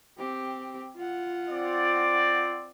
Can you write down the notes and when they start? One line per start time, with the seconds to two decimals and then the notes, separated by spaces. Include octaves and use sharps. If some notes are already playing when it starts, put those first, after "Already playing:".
0.17 C4 G4
0.97 F4 F#5
1.49 C4 D5